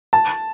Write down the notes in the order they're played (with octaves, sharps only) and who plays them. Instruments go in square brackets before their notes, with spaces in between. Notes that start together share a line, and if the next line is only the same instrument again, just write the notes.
[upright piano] A5